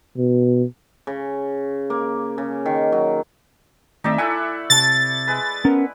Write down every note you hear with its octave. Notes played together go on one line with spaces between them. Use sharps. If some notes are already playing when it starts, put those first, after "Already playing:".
B2
C#3
A#3
C#3
D#3
F#3
D#3 A3 C4 D#4 D5 E5
A3 E4 F#5 G#5
C3 A5 A6
G#3 B4
B3 C#4 A#4